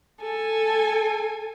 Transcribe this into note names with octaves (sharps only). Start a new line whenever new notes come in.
A4 G#5